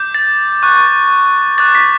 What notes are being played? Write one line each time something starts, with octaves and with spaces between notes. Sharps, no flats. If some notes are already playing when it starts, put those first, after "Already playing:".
Already playing: D6 G6
A6
C#6 F#6
D6 F#6 A6
B6